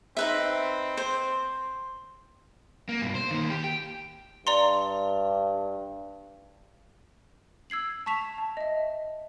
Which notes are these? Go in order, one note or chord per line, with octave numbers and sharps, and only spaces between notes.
C4 D#4 B4 E5
C5
A#3
G2 B2
C5
D#3 A#3
G4
G5
G2 D5 A#5 C6
E6 G#6 C7 F#7
A5 C#6 B6 E7 F7
A5
D#5 E5